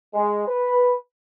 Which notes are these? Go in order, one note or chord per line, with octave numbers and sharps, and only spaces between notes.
G#3
B4